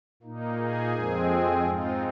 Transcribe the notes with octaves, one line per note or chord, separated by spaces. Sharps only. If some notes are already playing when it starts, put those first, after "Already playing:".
A#2 A#3 D#4
G#4
F2 F3 G#3 C4
G#2 G#3 C4 D#4 F4